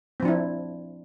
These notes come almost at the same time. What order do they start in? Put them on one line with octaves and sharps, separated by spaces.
C4 F3 D4 E4